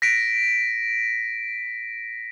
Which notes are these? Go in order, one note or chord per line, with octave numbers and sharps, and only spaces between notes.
A#6 B6 D7